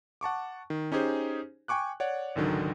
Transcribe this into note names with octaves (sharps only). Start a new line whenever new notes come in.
F#5 A5 C#6 D6
D#3
C#4 D#4 G4 G#4 C5
G5 G#5 C#6 D6 F#6
C#5 D5 F#5
G#1 C#2 D3 D#3 F#3